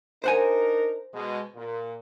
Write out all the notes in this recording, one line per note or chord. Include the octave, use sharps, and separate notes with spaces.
D4 D#4 A#4 C5 F#5 G#5
B2 G#3
A#2